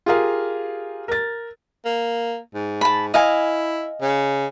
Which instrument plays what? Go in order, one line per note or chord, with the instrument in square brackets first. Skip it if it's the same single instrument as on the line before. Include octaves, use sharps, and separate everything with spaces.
[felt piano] F4 G4 G#4 A#4 F5
A#4 A6
[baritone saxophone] A#3
G#2
[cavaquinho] A5 B5
[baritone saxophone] E4 [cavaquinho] D#5 F5 G#5
[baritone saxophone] C#3